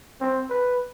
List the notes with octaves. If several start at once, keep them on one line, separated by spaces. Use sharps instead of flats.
C4
B4